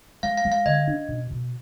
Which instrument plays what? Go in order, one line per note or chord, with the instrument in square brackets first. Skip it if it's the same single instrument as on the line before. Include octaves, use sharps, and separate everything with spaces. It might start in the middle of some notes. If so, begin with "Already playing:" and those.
[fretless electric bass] G#3 [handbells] F5
[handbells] F5
[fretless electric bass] G#3
[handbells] F5
[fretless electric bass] D3 [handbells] D#5
[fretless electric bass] D4
B2
B2